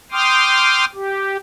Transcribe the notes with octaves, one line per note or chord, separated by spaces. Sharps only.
G5 C6 D6 D#6 F6
G4